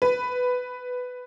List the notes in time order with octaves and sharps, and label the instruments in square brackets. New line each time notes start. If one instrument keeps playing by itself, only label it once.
[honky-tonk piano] B4